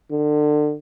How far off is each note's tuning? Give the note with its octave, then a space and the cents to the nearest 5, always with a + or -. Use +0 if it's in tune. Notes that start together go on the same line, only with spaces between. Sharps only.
D3 +30